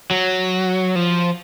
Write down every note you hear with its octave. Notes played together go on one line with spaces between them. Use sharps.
F#3
F3